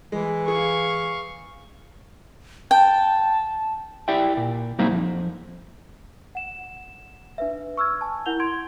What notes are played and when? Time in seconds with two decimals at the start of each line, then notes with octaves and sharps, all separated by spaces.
0.12 E3 G#3
0.48 G#4 F5 C#6
2.71 G5 A5
4.08 E4 G4 D5 E5 G5
4.37 A#2
4.79 F#3 G3 A#3 C4 D#4 E4
4.91 F2
6.35 F#5 E7
7.38 D4 B4 E5
7.77 C#6 E6 F6 G#6
8.01 G#5 A5
8.26 E4 A#4 F#5 G6 F7 G7
8.40 C6 G#6 D7